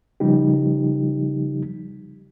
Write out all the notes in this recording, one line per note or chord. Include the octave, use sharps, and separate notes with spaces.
C#3 F3 G3 D#4 G4